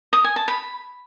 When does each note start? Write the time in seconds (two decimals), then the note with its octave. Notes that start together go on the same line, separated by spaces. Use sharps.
0.13 D#6
0.24 G#5
0.36 A5
0.48 B5